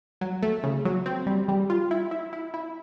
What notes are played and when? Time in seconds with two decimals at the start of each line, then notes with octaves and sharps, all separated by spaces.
0.21 F#3
0.43 A3
0.64 C#3
0.85 F#3
1.06 C4
1.27 G3
1.48 G3
1.70 F4
1.91 E4
2.11 E4
2.33 E4
2.54 E4